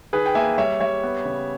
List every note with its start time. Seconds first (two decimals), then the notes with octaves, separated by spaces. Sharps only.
0.13 D#3 G#4 B4
0.26 G5
0.35 A#3 E5 G#5
0.58 G3 C#5 E5
0.80 G3 C#5 E5
1.03 B3
1.25 C#3